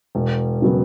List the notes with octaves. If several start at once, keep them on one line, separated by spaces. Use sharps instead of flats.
E1
C#3 F#3 B3